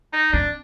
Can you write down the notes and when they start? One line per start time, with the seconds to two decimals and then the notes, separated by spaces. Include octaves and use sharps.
0.13 D#4
0.33 C4 D4